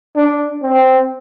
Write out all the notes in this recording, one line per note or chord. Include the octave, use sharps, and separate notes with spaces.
D4
C4